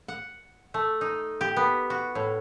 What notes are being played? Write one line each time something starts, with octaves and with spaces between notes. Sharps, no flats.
F#5
A3
D#4
G4
B3
F#4
A2